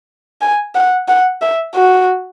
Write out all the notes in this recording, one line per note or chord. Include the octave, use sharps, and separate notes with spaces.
G#5
F#5
F#5
E5
F#4